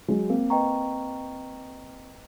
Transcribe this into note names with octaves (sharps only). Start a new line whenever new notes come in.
F#3 G#3
A#3 C4
B4 D#5 G5 A#5 C#6